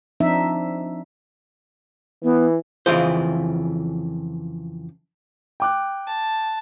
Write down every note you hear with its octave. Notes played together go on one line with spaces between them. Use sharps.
F3 C4 D4 D#4 E5
E3 B3
F2 C#3 E3 F4 G#4 C5
G5 D6 F#6
A5